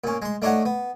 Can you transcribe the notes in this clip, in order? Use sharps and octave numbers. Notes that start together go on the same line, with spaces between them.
A#2 C#4
G#3 C6
A3 D4 D#4 C#5 F#5
B3